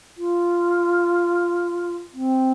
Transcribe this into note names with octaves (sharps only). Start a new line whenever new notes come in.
F4
C4